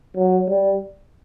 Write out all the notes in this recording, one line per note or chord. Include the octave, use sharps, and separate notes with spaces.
F#3
G3